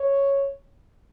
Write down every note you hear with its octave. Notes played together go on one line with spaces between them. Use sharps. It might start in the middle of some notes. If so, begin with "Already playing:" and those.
Already playing: C#5